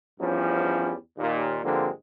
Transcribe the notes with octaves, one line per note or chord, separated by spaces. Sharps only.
E2 G2 F3 G3 C#4
D#2 A#2
G2 D3 F3 G#3 A#3 C4